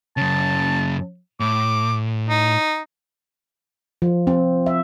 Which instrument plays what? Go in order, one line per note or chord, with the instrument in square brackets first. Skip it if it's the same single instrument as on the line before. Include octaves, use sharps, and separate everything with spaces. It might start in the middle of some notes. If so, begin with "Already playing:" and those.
[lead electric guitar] F#2 C#3 [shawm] A5
[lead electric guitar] A2 [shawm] D6
[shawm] D#4
[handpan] F3
C4
E5